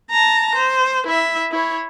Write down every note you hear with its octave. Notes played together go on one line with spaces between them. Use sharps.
A5 A#5
C5
E4 E5
E4 C#5